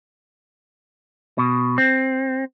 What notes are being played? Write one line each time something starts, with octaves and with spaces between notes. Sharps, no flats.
B2
C4